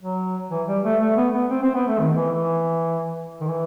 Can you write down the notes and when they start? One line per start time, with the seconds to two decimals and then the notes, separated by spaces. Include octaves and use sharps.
0.02 F#3
0.51 E3
0.68 G3
0.84 A3
1.01 A3
1.17 B3
1.33 B3
1.50 C4
1.62 C4
1.74 B3
1.87 A3
1.99 D#3
2.16 E3
2.32 E3
3.41 D#3
3.48 E3